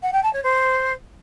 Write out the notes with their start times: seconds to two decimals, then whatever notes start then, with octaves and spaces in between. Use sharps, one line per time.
0.02 F#5
0.12 G5
0.23 A5
0.33 C#5
0.43 C5